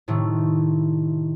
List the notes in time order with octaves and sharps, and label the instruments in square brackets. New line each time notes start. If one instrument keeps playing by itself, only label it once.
[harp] A2 C3 D#3 A3